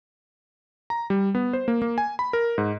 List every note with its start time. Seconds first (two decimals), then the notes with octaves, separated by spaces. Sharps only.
0.90 A#5
1.10 G3
1.35 B3
1.53 C5
1.68 A#3
1.82 A#3
1.98 G#5
2.19 B5
2.33 A#4
2.58 G#2